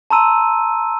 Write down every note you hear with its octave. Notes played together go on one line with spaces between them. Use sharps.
A5 A#5 C6 E6 D#7